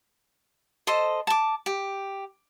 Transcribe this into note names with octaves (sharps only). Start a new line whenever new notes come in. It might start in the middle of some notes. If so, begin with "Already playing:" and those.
A4 C5 D#5
A5 D6
G4